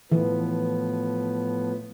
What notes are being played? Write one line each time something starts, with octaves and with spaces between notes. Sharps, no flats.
A2 E3 F3 B3